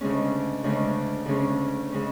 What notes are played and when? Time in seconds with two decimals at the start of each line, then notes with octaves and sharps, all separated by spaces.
0.01 D2 C#3 G#3 C#4
0.64 D2 C#3 G#3 C#4
1.26 D2 C#3 G#3 C#4
1.92 C#3 G#3 C#4